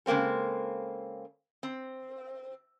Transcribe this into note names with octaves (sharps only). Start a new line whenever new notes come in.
C#3 G#3 A#3 C4 A4
C4